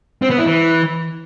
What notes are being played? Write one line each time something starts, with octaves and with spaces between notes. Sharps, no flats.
C4
B3
E4
E3